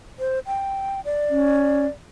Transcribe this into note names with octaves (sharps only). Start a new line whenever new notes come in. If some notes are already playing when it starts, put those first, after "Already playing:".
C5
G5
D5
C#4